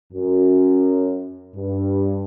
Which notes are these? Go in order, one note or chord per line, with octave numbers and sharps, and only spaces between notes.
F#2
G2